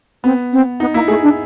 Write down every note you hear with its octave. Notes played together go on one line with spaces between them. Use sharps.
B3 C4
C4
B3 D#4
A#3 E4
A3 G#4
D4